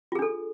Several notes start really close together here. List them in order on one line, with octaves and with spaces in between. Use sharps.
F4 G#4 D4 A4